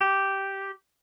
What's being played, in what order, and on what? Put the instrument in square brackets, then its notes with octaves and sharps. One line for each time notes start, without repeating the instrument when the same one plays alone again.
[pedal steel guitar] G4